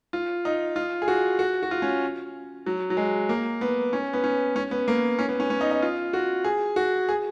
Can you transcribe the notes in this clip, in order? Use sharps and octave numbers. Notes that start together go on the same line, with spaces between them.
F4
D#4
F4
G#4
F#4
F#4
F#4
F4
C#4
F#3
F#3
G#3
A#3
B3
C#4
B3
C#4
C#4
B3
A#3
C#4
B3
C#4
C#4
D#4
D#4
F4
F#4
G#4
F#4
G#4